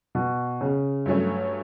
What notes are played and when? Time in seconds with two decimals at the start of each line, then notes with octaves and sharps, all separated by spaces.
0.15 B2
0.61 C#3
1.06 G2 F#3 A3 C#4